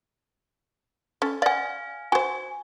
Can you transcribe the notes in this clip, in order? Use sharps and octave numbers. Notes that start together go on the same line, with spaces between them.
C#4 A4
D5 F5 F#5 G#5
F#4 C5 G#5